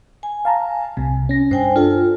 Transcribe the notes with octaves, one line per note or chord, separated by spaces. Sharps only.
G#5
F5 A5 A#5
C2 C3
C#4 A#6
G2 C5 G5 G#5
D4 F4 A4